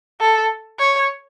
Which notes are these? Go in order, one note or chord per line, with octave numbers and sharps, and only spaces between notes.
A4
C#5